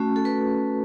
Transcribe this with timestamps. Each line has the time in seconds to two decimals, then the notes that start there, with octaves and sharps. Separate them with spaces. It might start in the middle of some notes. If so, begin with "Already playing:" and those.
Already playing: A3 C#4 F#4
0.16 A4
0.25 B4